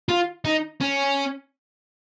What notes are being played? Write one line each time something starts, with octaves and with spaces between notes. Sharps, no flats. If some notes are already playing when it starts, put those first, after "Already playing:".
F4
D#4
C#4